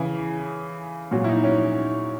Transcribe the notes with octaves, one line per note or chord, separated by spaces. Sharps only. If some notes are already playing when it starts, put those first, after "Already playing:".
Already playing: C#3 E3 G#4
A#2 F#3 F#4
E4
D#4
C#4